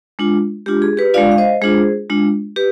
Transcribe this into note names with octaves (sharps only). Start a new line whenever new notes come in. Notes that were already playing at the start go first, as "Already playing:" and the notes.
G#3 D4 F4
G#3 D4 F4 G4
G#4
G4 B4
G#3 D4 F4 D5 F5
F5
C5 D#5
G#3 D4 F4 G#4 C5
G#3 D4 F4
G4 B4